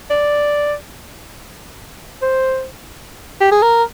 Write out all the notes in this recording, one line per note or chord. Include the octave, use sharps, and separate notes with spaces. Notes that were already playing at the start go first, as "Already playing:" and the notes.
D5
C5
G4
G#4
A#4